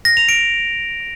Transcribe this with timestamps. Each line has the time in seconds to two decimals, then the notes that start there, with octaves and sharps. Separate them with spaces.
0.05 A#6
0.17 F7
0.29 D7